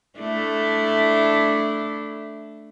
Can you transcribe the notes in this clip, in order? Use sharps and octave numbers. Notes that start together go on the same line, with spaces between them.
A3 D4 E4